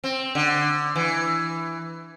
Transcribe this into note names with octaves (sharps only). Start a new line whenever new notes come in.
C4
D3
E3